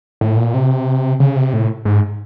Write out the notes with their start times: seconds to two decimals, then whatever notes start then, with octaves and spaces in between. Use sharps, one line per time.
0.21 A2
0.37 A#2
0.54 C3
1.20 C#3
1.36 C3
1.53 A2
1.85 G#2